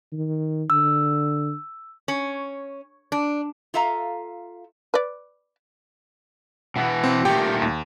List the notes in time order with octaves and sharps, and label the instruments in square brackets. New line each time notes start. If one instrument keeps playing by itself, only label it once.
[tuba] D#3
[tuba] D3 [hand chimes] E6
[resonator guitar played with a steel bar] C#4
D4
F4 A4 E5 F5 A#5
[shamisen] B4 D5
[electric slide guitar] B2 E3 B3
[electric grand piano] C4
[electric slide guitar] A#2 D#3 A3 [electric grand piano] G4 G5
[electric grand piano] D#2